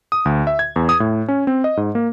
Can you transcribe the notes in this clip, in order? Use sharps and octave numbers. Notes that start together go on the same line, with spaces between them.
D#6
D2
E5
G#6
E2
D#6
A2
C#4
C4
D#5
G#2
A#3